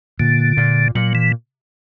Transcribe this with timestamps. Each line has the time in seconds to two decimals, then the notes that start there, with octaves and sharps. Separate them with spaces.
0.20 A#2 D3
0.57 A#2
0.95 A#2 F#3
1.15 E3